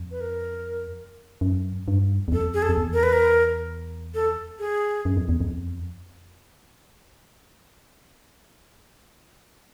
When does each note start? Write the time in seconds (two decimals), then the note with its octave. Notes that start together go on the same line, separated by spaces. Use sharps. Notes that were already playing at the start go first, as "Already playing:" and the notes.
Already playing: F2
0.11 B4
0.21 A#4
1.41 F#2
1.88 G2
2.28 E2
2.32 F2 A4
2.54 G#4
2.62 A4
2.69 F2
2.78 E2
2.93 A#4
3.03 B4
3.13 A#4
4.15 A4
4.59 G#4
5.05 F#2
5.17 F2
5.29 E2
5.41 F2